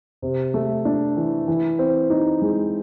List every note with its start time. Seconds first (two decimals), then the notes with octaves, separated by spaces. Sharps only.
0.22 C3
0.54 A3
0.85 D4
1.17 E3
1.48 E3
1.79 C4
2.10 D#4
2.42 G#3